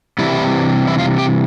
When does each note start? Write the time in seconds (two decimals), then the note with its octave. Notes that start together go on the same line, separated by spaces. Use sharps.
0.19 C3 E3 G3 E4
0.87 E4
0.98 F4
1.18 G4